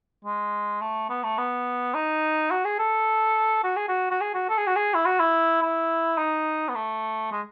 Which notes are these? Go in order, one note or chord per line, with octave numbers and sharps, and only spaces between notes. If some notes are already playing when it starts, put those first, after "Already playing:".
G#3
A3
B3
A3
B3
D#4
F#4
G#4
A4
F#4
G#4
F#4
F#4
G#4
F#4
A4
G#4
F#4
G#4
E4
F#4
E4
E4
D#4
B3
A3
G#3